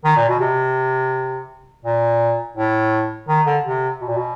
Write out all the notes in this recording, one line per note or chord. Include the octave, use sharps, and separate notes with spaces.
D#3
A#2
B2
C3
A#2
A2
D#3
D3
C3
B2
A#2
B2